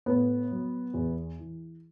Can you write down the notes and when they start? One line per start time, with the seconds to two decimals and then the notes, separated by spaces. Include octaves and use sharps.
0.06 A2 B3
0.51 F#3
0.94 E2
1.39 E3